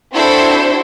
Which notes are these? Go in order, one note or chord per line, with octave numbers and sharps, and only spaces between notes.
C4 D4 E4 F#4 A4 C5